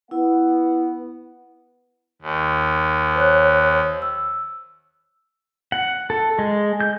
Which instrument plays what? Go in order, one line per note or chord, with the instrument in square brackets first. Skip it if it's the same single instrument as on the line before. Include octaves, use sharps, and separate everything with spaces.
[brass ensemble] B3 F#5 [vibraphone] E4
[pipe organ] D#2
[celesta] C5 C#5 F#6
E6
[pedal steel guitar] F#5
A4
G#3
G6